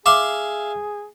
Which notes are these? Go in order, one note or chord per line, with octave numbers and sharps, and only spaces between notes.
G#4 E5 F5 C6 D6